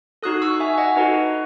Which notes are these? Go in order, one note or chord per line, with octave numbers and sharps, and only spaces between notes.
D#4 F#4 A4 D#6 F#6
C#6 E6
E5 G#5
D#5 F#5
D#4 F#4 A4 B4